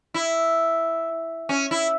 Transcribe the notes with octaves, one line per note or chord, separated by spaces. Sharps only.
E4
C#4
E4